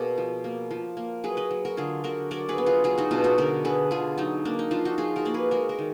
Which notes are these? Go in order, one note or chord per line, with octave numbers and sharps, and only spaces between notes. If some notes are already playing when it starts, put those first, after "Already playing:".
Already playing: B2 A#3 G#4 A#4 D5
F3
A#3
F3
A#3
F#3 G#4 B4
B4 D#5
F#3
F#4 A#4
D3 F4 G#4
D3 F#4 A#4
F#3 A#4 D5
G#4 B4
B3
F4 G#4
F#3 F4 G#4
D#4 F#4
B2 D4 F4
D#4 F#4
D3 F#4 A#4
D3 G#4 B4
D3 F4 G#4
F#3 D#4
A#3 D4
D#4
F3 D4 F4
D#4 F#4
F3 F4 G#4
F#4 A#4
A#3 D5
G#4 B4
G#3 F#4 A#4
F#4 A#4
D#3